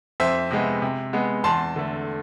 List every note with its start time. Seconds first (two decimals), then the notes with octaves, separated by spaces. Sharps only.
0.20 F2 C5 E5
0.51 C3 G#3 B3
0.82 C3
1.13 G#3 B3
1.44 E2 A5 C6
1.76 D3 A3